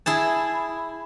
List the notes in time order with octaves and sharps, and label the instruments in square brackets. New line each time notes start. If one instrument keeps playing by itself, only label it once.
[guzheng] E4 G#4 A5